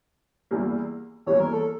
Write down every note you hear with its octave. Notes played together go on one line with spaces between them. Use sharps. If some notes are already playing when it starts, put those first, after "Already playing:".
E2 E3 G3 A#3
E2 E3 G3 A#3 C#5
A#4
A4